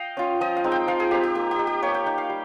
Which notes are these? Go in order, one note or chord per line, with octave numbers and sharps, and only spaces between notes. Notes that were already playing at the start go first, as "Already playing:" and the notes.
Already playing: D#5 F5 G5
C#4 F4
F3 D#5
F5
G#3 C4 D#4
G5
F3 F5
G#4
G#3 C4 D#4 G4
G4
A#3 G4
G4
D#4
G4
A#3 C#5
G5
D#4 G5
F5
G3